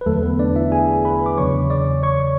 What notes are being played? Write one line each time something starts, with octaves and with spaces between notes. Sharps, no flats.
B4
E2 D3 F#3 A3 A4
B3 B4
D4 D5
E4 E5
G#4 G#5
B4 B5
D6
E2 C#3 F#3 C#5 C#6
D5 D6
C#5 C#6